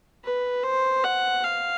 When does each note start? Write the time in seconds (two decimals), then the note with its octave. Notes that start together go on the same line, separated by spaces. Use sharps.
0.25 B4
0.64 C5
1.04 F#5
1.45 F5